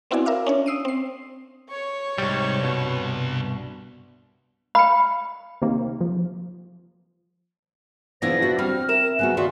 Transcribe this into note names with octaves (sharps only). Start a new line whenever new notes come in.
B3 C4 E4 F#4 D5 G#5
A#4 E5 F5 D6
C#4 D4 C#5
D#6 E6 C7 D7 D#7
C4 C7
C#5 C#6
C2 G#2 G3
G2 B2
F5 B5 C#7
C3 D#3 A#3
F3
C#3 E3 B3 D4 E4 F4 C5 A#6
B3 F#4 C5
G3 C4 F6
A#4 E5 E7
C#3 B3 F#4 G#5 F#6
D#3 F#4 D5 E5 F5 C6